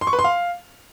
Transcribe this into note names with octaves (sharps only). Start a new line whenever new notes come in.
C6
C#6
B4
C6
F5